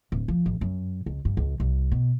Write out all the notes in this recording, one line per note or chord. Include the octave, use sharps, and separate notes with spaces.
D1
F3
A1
F#2
C#2
G2
C#2
C2
B2